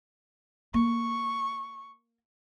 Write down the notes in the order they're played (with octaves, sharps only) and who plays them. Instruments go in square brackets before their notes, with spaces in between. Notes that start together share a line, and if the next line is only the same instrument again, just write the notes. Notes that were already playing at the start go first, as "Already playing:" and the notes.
[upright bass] A#3 [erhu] C#6